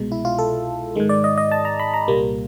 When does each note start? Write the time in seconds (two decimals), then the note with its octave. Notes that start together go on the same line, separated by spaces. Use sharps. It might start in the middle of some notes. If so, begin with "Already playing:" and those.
Already playing: C2 B2 G#3
0.12 E4
0.25 F4
0.39 A4
0.95 G#2 D#3 G#3
1.09 D5
1.24 D#5
1.38 D#5
1.51 A5
1.65 A#5
1.80 B5
1.94 A#5
2.08 C2 A#2 G3 A#3